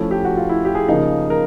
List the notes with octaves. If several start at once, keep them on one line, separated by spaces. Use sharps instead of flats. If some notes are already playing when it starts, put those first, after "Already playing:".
Already playing: F3 A3 C#4 E4
G4
F#4
F4
E4
G4
G#4
C#3 F3 A#3 D#4
A#4